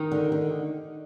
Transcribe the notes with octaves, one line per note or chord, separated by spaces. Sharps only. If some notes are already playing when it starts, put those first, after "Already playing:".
Already playing: D#3 D#4
D3
D3